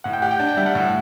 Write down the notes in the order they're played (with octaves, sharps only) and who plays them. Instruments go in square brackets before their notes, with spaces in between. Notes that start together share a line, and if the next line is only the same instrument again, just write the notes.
[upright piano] A2 [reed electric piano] F#5
[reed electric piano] G5
[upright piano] G4 [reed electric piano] F#5
[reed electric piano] G5
[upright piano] D4 [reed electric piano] A5
[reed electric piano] G5
[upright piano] G3 [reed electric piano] E5
[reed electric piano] F#5
[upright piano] A2